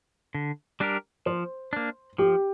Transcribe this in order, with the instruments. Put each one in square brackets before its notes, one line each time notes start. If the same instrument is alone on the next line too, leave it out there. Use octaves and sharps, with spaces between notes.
[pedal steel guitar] D3
G3 D4 G4 A#4
[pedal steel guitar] F3 [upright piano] C5
[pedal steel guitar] A#3 D4
[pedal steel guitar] F3 [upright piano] G4